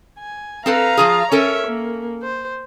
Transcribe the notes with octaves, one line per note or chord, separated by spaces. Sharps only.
G#5
C4 A4 B4 F5 A#5
F3 F4 G#4
C#4 A4 A#4 C#5 E5
A#3
C5